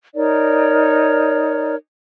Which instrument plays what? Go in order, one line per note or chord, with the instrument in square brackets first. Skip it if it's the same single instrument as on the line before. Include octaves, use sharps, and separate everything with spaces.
[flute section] D#4 A#4 C#5 D5